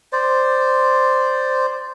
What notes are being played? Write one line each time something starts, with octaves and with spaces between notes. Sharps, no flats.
C5 D5